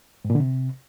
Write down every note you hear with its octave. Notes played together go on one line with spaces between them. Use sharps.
G#2
A#2
D3
C3